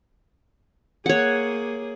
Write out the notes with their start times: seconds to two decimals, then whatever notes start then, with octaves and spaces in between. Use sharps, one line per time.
1.06 A#3 G#4 C#5 F#5